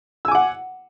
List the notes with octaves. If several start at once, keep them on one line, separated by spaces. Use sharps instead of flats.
F#5 G#5 D6 E6